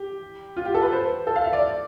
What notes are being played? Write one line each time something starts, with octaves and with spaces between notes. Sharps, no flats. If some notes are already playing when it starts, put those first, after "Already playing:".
Already playing: G4
F4
G4
A4
B4
C5
A4
F5
E5
D5